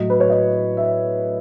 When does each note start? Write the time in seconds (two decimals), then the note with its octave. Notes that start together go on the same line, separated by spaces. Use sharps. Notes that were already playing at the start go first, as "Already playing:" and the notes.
Already playing: A2 F#3 D#5
0.10 B4
0.20 C#5
0.30 D#5
0.77 E5